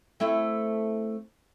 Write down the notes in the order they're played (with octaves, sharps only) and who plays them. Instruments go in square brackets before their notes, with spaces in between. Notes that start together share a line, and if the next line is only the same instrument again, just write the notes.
[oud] A3 C4 E4